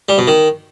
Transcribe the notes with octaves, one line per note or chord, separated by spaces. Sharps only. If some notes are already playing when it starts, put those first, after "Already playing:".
G3
B2
D#3